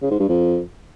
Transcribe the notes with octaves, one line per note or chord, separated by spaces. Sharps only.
C#3
G#2
G2
F2